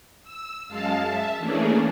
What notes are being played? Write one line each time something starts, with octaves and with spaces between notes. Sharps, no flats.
E6
F#2 G#3 F5 A5
E5 A5
E3 A3 A#3 C#4 D4 G#4